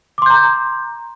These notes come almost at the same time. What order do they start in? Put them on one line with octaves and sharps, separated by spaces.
D6 C6 G6 A#5